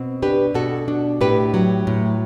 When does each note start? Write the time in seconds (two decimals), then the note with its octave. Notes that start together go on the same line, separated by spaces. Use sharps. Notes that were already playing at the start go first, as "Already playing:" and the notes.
Already playing: B2 C4
0.22 D4 G4 B4
0.54 B2 F#4 A4
0.88 D4
1.21 A2 G4 B4
1.54 F#3
1.87 A2